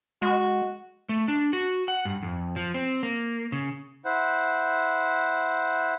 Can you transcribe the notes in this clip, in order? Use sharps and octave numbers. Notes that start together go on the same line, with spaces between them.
G#3 F#4
A3
D4
F#4
F#5
G2
F2
F3
C4
A#3
C#3
E4 C5 F#5